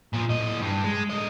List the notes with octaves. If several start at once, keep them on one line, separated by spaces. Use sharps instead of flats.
A#2 F3
A2 D#5
G2
G#3
D3 D#5